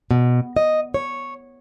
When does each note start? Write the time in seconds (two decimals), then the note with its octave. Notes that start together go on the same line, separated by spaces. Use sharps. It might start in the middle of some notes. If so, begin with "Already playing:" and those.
0.11 B2
0.56 D#5
0.94 C#5